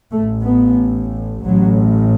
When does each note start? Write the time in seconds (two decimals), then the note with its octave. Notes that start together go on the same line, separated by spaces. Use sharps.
0.12 A1 A2 A3
0.45 B3
1.44 A1 A2 F#3